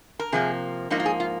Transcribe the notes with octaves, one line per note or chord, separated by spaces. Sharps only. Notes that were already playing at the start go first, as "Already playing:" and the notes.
A#4
C3 F3 A#3 G#4
G#2 F3 A#3 D#4
F4
G#4
F4